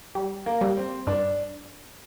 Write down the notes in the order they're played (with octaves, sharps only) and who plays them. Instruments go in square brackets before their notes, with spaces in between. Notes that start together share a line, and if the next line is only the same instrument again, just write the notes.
[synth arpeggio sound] G3
[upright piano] A#3
[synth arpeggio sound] G3
[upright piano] C4
[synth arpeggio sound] G2 [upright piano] D4